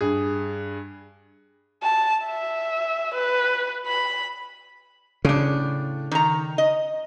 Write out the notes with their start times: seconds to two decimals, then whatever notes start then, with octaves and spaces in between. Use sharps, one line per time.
0.01 G2 G#4
1.83 A5
2.26 E5
3.15 B4
3.87 B5
5.25 A2 C#3 D4
6.11 D#3 A#5
6.58 D#5